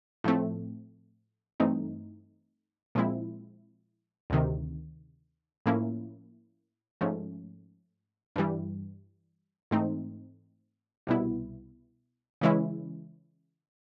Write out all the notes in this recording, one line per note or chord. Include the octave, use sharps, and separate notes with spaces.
A2 F3 A3 C4
G2 E3 A3 C4 D#4
A#2 F3 G#3 C4 E4
D2 C3 D#3
A2 F3 A#3 C#4 E4
G#2 F3 A3 C#4
G2 E3 G3
G#2 E3 A3 C4 D#4
C2 B2 G3 B3 E4
C#3 E3 G#3 C#4 E4